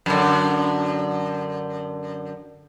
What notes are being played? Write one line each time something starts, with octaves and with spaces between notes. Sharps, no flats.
F#2 D3